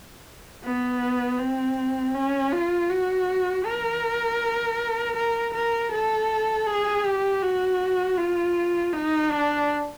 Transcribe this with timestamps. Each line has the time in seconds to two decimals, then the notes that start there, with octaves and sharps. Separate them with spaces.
0.64 B3
1.39 C4
2.14 C#4
2.52 F4
2.90 F#4
3.66 A#4
5.16 A#4
5.54 A#4
5.91 A4
6.66 G#4
7.05 G4
7.42 F#4
8.17 F4
8.93 D#4
9.31 D4